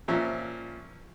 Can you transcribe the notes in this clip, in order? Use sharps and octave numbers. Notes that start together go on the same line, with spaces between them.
A#2 F3 C#4 E5 A#5